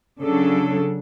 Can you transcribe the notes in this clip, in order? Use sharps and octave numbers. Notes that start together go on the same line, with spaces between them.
C#3 F#3 D4 A4